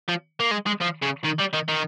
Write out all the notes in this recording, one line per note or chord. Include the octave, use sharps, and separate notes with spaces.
F3
A#3
G#3
G#3
F3
C#3
D#3
G3
D#3
D#3